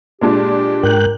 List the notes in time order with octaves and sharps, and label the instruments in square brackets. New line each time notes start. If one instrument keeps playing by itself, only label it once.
[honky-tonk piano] A#2 G#3 D4 [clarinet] G4
[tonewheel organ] G#2 G5 F#6 [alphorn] A#4